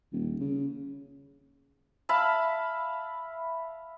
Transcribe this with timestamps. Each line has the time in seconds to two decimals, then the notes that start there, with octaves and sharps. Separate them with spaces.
0.12 D#1
0.40 C#3
2.09 E5 F5 A5 B5